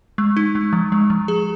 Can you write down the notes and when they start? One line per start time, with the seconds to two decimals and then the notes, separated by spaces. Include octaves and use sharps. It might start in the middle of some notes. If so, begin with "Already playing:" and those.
0.18 G#3
0.37 D#4
0.55 G#3
0.73 F3
0.92 G#3
1.10 F3
1.28 G#4